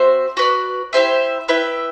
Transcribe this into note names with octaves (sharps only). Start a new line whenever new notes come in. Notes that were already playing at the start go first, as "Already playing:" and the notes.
Already playing: C4 F#4 C5 E5
F#4 B4 D5
E4 G4 C5 E5
E4 B4 E5 G5